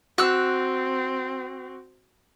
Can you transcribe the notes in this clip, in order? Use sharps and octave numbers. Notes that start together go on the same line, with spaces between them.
C4 F#4 E6 F#6